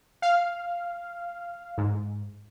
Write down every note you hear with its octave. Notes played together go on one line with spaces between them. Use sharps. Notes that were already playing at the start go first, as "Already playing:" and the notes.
F5
G#2